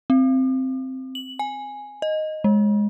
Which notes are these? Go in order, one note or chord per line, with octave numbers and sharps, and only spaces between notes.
C4
F#7
G#5
D#5
G#3